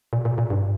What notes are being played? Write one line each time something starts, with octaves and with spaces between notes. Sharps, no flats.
A#2
A#2
A#2
G2